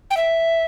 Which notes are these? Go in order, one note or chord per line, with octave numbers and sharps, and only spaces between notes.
G5
E5